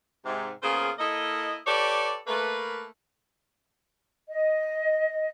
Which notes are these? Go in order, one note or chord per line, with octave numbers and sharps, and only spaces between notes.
G#2 C3
C#3 A#3 B3 F4 G#4 C5
A#3 E4 A4 D#5
G4 A4 B4 C#5 D5
A3 A#3 B4
D#5